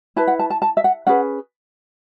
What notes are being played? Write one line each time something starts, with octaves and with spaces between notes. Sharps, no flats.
E4 B4 A5
F#5
A5
A5
A5
E5
F#5
C#4 G#4 B4 F#5